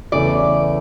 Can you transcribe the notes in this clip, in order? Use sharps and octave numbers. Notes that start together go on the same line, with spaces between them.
E2 C#3 E3 A3 E4 D5